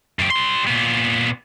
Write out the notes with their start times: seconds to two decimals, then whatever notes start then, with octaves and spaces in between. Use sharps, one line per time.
0.19 F#2 G4
0.31 G3 C6
0.67 A#2 B3